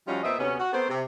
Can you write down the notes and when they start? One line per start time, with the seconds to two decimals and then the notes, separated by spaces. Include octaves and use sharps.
0.07 F3 G3 C#4 D#4 F4 F#4
0.24 A#2 B3 C4 D#5 E5
0.39 D2 C3 B3 C#4
0.59 F#4
0.73 A3 B3 C4 A#4 C5
0.89 C3